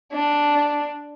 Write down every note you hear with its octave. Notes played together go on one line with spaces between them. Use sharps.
D4